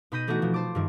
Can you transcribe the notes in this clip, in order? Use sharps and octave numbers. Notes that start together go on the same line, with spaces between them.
B2 D#4 B5 G6 A#6 D#7
E3 A3 B3 D#4 E4 F#4
B2 F3
C5 A5 D6
G2 D#3 E4